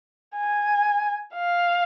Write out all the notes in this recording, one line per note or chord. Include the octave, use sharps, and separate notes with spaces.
G#5
F5